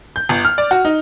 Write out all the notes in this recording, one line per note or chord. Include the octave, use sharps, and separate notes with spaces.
G6
G1
F6
D5
F#4
D#4